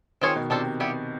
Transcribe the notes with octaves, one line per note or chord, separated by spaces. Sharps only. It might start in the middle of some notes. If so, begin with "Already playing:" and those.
D#3 C4 F4 G#4 C#5
B2
C3 D4 F4 A4 C5
G3 B3 E4 G4